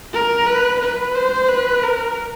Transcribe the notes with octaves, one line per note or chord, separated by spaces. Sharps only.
A#4
B4
B4
C5
B4
A#4